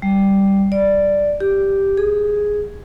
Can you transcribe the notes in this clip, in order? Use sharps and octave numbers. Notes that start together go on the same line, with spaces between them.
G3
D5
G4
G#4